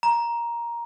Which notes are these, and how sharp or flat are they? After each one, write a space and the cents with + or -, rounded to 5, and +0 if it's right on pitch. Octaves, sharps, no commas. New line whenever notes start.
A#5 +10